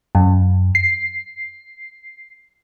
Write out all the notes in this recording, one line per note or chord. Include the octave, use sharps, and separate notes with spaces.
F#2
C7